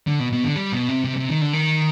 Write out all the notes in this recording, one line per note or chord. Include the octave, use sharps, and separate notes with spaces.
D3
B2
B2
D3
G3
B2
C3
C3
C3
D#3
D3
D#3